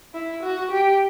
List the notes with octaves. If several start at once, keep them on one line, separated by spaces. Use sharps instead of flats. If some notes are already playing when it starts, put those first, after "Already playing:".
E4
F#4
G4